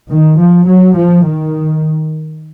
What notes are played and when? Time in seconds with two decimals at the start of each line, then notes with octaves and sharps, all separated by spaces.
0.10 D#3
0.39 F3
0.67 F#3
0.96 F3
1.25 D#3